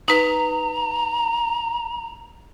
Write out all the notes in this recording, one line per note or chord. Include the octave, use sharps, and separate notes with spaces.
D#4 B4 A#5